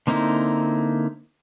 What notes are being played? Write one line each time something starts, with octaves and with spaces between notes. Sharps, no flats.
D3 A#3 C4 D#4 E4